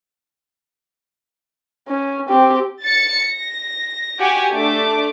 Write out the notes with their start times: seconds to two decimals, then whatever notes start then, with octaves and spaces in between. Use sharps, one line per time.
1.88 C#4
2.29 C4 G4
2.83 A6 C#7
3.29 A#6
4.20 F#4 G4 F#5 G#5 D6
4.52 A3 D4 D6